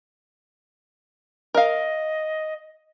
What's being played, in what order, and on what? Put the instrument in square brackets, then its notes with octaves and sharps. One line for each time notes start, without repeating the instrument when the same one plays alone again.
[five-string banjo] A#4 F5 [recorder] D#5